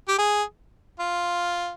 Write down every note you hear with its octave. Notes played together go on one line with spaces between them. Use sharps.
G4
G#4
F4